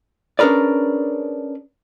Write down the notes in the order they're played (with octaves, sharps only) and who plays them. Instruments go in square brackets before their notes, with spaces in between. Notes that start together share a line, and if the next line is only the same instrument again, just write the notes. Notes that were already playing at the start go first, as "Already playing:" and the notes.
[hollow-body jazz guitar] C#4 D4 G#4 A#4 B4 D5